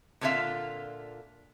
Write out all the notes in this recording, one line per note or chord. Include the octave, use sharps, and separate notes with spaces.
A#2 D3 C#4 F4 E5 F5